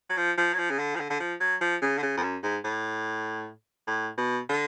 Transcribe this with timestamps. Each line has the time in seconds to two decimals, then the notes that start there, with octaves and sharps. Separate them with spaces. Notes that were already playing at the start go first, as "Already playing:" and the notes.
0.10 F#3
0.17 F3
0.38 F3
0.54 F#3
0.58 F3
0.70 C#3
0.79 D3
0.95 F3
1.00 D3
1.10 D3
1.20 F3
1.41 F#3
1.61 F3
1.82 C#3
1.98 D3
2.02 C#3
2.17 F2
2.23 F#2
2.43 G#2
2.64 A2
3.88 A2
4.18 B2
4.50 D3